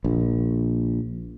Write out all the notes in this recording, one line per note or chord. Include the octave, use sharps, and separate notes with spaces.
A#1